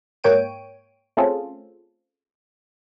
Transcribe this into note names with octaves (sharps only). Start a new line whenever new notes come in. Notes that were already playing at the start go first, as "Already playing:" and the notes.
G#2 A#3 C#5 G5 D7 D#7
A3 C4 C#4 F4 G#4 A4